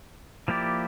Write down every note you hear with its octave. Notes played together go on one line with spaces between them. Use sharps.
F3 A#3 E4 G4 D5